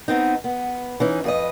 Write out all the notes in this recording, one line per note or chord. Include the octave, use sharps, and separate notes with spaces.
B3 C4 D#4
B3
E3 C#4 D#4
F2 B4 D#5